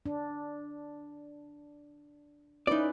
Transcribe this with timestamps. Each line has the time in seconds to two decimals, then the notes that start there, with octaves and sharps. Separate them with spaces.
0.06 D4
2.67 C#4 D#4 E4 B4 D5